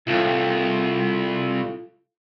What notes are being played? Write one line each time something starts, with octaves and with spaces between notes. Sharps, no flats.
C2 E4 F4 A4